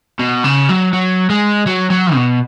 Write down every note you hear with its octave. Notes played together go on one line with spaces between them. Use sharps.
B2
C#3
F#3
F#3
G#3
F#3
F#3
B2